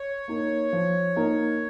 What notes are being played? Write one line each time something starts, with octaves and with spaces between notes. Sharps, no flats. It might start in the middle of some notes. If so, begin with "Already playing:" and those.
Already playing: C#5
A#3 D#4 A#4
F3
A#3 D#4 A#4